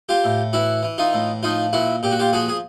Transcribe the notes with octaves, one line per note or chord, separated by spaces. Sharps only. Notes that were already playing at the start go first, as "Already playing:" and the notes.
F4 G4
A2
E3 E4 F#4
E3
D#4 F4
A2
F3 D#4 F4
A#2 E4 F#4
A#2 G4
F#4
F4 G4
F3 F#4 G#4
G#4